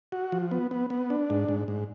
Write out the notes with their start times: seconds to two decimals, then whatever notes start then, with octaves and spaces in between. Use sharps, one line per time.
0.12 F#4
0.32 F3
0.51 B3
0.71 B3
0.90 B3
1.10 D4
1.30 G#2
1.48 G#2
1.68 G#2